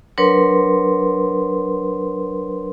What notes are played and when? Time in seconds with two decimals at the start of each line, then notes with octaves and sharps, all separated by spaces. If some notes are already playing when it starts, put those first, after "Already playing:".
0.18 F#3 D4 A#4 B4 C#5 C6